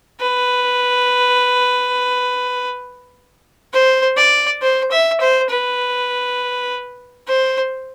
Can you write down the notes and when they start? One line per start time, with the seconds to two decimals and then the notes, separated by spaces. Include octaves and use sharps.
0.20 B4
3.73 C5
4.17 D5
4.62 C5
4.91 E5
5.21 C5
5.50 B4
7.28 C5